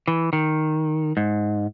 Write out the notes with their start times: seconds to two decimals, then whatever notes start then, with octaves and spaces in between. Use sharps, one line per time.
0.08 E3
0.33 D#3
1.17 G#2